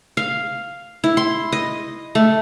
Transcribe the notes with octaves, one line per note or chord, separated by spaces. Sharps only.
F5
E4
C6
D#5
A3